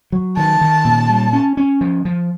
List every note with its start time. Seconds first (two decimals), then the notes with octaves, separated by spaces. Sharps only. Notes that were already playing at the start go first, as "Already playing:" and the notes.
0.12 F#3
0.37 D#3 A5
0.61 D#3
0.85 A#2
1.09 G3
1.33 C#4
1.57 C#4
1.81 F3
2.05 F3